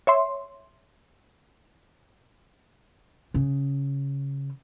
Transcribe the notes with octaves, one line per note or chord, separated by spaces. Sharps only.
C#5 E5 C6
C#3